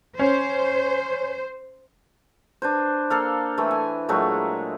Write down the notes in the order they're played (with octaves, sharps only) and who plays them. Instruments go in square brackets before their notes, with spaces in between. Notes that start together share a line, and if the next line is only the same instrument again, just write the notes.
[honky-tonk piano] C#4 [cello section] C5
[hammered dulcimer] D4 B4 C5
A#3 A4 F5
E3 A3 E4
G#5
A#2 F#3 G#3 A3